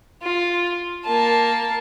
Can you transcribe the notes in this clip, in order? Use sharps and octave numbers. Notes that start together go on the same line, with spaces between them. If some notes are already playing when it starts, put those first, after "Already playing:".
F4
A#3 A5